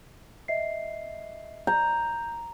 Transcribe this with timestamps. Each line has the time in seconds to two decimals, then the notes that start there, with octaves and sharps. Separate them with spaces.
0.48 D#5 E5 C7
1.67 A#5 G6